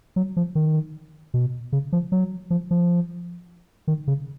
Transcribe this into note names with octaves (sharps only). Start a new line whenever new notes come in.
F#3
F3
D#3
B2
C#3
F3
F#3
F3
F3
D#3
C#3